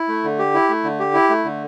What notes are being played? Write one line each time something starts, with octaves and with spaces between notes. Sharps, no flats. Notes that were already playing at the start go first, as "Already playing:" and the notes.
Already playing: E4
A3
D3
G4
E4
A3
D3
G4
E4
A3
D3